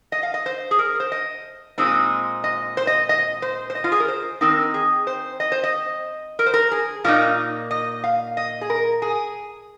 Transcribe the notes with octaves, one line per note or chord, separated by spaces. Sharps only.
D#5
F5
D#5
C5
G#4
A#4
C5
D#5
A#2 G#3 C4 D#4
D#5
C5
D#5
D#5
C5
C5
D#5
F4
G#4
A#4
C5
D#3 C4 D#4 A#4
G#4
C5
D#5
C5
D#5
A#4
C5
A#4
G#4
A#2 A#3 D#4 F4
D#5
F5
D#5
G#4
A#4
G#4